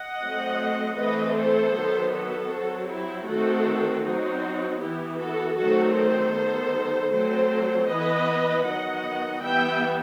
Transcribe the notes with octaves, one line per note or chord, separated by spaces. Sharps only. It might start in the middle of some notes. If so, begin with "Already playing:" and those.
Already playing: D#5 F#5
F#3 A3 C4
E3 A3 C4 B4 D#5
A4 C5
D#3 F#3 B3
F#4 A4
F#3 C4
E4 G4
D#3 A3 C4 F#4 A4
F#3 C4 D#4 F#4
E3 B3 E4 G4
F#4 A4
D#3 F#3 A3 C4 F#4 A4
A4 C5
D#3 G3 B3
F#3 A3 C4 A4 C5
E3 B3 B4 D#5
D#3 F#3 B3 D#5 F#5
E3 G3 B3 E5 G5